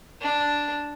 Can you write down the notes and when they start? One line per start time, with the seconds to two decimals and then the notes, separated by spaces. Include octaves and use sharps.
0.21 D4